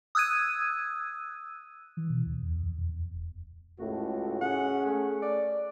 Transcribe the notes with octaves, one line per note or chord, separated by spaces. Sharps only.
D#6 E6 F#6 G#6 D#7
E3
B2
D2
E2
F2
E2
D#1
C#2 A2 A3 F#4
C#4 G#4 F#5
A3
D5